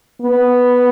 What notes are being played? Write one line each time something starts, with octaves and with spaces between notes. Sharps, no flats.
B3